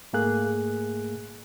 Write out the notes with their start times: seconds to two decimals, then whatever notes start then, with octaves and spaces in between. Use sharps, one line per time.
0.13 G#2 A3 A#3 G#4 F#6